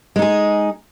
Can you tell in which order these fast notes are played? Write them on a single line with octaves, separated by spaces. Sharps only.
G#3 D#4 G#4